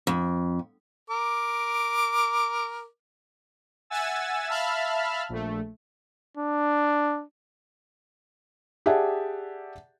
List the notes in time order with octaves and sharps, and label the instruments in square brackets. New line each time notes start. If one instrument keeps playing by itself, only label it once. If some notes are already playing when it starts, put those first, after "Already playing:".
[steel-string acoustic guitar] F2
[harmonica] A#4 D6
[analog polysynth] E5 F#5 G#5 E6 A6
E5 F5 A5 B5 F6
A#1 A3
[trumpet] D4
[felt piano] G4 G#4 D5 E5 F#5 A5